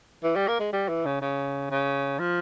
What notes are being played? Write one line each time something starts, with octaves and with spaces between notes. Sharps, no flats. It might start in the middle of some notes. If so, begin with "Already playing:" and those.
E3
G3
A#3
G#3
G3
E3
C#3
C#3
C#3
F3